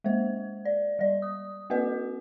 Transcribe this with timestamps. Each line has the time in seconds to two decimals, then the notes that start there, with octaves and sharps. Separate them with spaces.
0.04 G#3 A#3 C5
0.65 D5
0.99 G3 D5
1.22 D#6
1.70 A#3 C4 F#4 B4 D#5